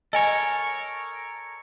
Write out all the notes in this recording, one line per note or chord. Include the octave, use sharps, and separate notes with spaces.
A4 A#4 C#5 D#5 G#5